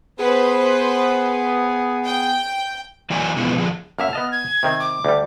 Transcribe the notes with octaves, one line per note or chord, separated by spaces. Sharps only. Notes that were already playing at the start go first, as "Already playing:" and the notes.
B3 G#4 B4 C5
G5
E3 F#3 A#3 D5 G#5
B2 E3 F3 G#3 B3
D3 F3 G#4
F#2 A#3 E5 F6
B3 D#5 A5
G#6
C3 D#3 C4
D6
D2 G3